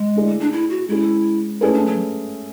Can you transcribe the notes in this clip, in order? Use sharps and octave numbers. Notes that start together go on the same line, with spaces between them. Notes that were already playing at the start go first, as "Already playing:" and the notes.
Already playing: G#3
D3 A3 E4 G#4 D5
D4
E4
F#4
G#3 C#4 E4 G#4
A3 C#4 E4 G#4 B4
D4
F#3